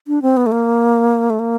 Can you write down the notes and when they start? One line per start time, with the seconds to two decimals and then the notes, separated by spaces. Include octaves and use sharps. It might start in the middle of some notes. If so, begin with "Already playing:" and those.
0.08 D4
0.22 C4
0.37 B3
0.46 A3
0.52 A#3
1.30 A3
1.39 A#3